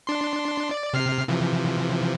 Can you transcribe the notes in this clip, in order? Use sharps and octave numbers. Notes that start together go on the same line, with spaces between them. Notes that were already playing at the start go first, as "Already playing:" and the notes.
D4 C6
D5
C3 F6 C7
C3 E3 F3